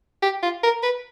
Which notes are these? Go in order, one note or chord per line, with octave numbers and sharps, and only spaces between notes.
G4
F4
A#4
B4